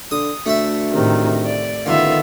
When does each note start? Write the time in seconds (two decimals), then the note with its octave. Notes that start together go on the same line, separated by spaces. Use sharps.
0.11 D3 D#6
0.46 D2 A3 E5
0.93 A2 C3 D#3
1.46 D5
1.86 A1 D3 D#3 B3 F4 E5